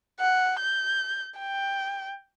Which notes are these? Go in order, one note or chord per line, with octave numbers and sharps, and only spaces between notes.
F#5
G6
G5